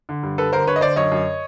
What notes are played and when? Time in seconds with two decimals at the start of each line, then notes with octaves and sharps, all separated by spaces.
0.09 D3
0.23 G2
0.38 G2 A4 B4
0.53 D3 A#4 C5
0.67 D3 B4 C#5
0.76 D#5
0.81 D3 C5 D5
0.96 F#2 C#5 D#5
1.12 F#2